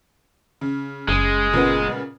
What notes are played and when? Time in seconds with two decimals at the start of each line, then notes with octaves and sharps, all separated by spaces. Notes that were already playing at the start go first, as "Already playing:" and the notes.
0.61 C#3
1.09 F#1 G#3
1.53 A#2 C#3 B3